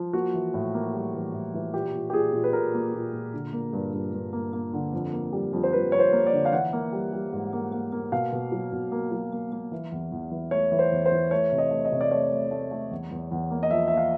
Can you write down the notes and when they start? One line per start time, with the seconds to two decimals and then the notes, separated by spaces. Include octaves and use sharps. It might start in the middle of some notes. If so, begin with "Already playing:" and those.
Already playing: F3
0.13 A#3 F#4
0.34 E3
0.54 A2
0.74 A#3
0.94 G3
1.14 E3
1.33 A2
1.54 E3
1.74 A#2 G4
1.94 A#2
2.10 G4
2.13 A#2 G#4
2.33 A#2
2.44 B4
2.53 A#2 A#4
2.74 A#3
2.94 A#2
3.13 A#2
3.33 D3
3.53 A#3
3.73 G2
3.93 G2
4.13 G2
4.33 A#3
4.53 A#3
4.73 D3
4.93 F2
5.13 A#3
5.33 G3
5.53 F2
5.63 C5
5.73 F2 B4
5.92 F2 C#5
5.99 C5
6.13 A#3
6.27 D5
6.33 D3
6.45 F5
6.52 E3 F#5
6.73 A#3
6.92 G3
7.13 G3
7.33 G#2
7.53 A#3
7.72 A#3
7.92 A#3
8.12 B2 F5
8.32 B2
8.52 F#3
8.72 B2
8.92 A#3
9.12 F#3
9.33 A#3
9.52 A#3
9.72 E3
9.92 E2
10.12 E2
10.31 E3
10.51 A3 C#5
10.72 E3
10.79 C5
10.92 E2
11.06 C5
11.12 E3
11.31 A3 C#5
11.52 C3
11.58 D#5
11.71 A3
11.85 D#5
11.92 C3
12.01 D5
12.11 A3 C#5
12.32 A3
12.51 A3
12.71 A3
12.91 E2
13.11 E2
13.31 E2
13.51 A#3
13.63 D#5
13.71 F3 E5
13.88 A#3 E5
13.97 F5